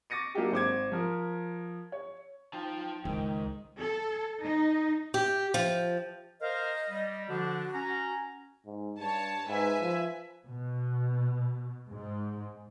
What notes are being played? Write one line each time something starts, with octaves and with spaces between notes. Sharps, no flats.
C#6 D6 A6 A#6 C#7 D#7
F#3 A#3 D4 D#4 G4 G#4
G#1 C5 D6 G#6
F3 A#4
C#5
D#4 F4 G5 A5
C#2 G#2 D#3
A4
D#4
G4
F3
A#4 C5 D#5 F5
G3
D3 F3 D4 F#4
C#4 A#5
G#2
G2 C#5 A5
G#2 B4 E5 G#5
F3
B2
G#2